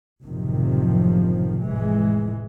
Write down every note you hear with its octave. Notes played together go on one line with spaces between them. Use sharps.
F#1 A2 C3 D#3 F3
F1 A2 E3 G#3